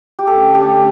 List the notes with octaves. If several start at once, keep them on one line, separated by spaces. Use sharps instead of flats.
G4
D3 A3 C#4 A4
G4